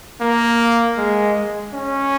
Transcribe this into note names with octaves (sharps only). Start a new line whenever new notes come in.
A#3
G#3
C#4